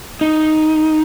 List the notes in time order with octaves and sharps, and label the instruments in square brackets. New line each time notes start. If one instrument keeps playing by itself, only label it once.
[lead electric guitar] D#4